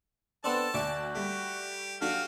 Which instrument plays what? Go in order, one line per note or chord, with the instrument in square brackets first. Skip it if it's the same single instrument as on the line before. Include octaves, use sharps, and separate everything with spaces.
[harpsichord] B3 C4 D4 [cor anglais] A4 [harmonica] A5
[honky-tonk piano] D2 [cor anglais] F#4 [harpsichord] D5 E5 D6
[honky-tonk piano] G3 A3 [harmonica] G4
[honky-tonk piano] F#3 D4 A4 [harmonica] F#4 G4 [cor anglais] F5